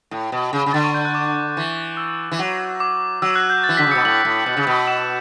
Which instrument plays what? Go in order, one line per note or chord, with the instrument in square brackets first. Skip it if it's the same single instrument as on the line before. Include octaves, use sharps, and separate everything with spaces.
[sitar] A2
B2
C#3
C#3
[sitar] D3 [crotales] A6
[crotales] C#6
G6
F#6
D6
[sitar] E3
[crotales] E6
[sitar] E3
F#3
[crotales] D6
[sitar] F#3 [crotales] E6
[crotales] F#6
G6
A6
[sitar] E3
[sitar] D3 [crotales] B6
[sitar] C#3
[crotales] C#7
[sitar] B2
[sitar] A2 [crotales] F#7
[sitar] A2
B2
C#3
B2
[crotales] E7